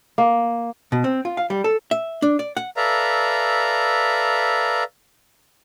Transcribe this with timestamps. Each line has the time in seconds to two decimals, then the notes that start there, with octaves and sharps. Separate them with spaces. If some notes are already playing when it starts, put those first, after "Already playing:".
0.18 A#3
0.92 B2
1.04 C4
1.25 F4
1.37 F5
1.50 G3
1.64 A4
1.91 E5
2.22 D4
2.39 D5
2.57 F#5
2.76 A4 B4 D5 E5 F5 A#5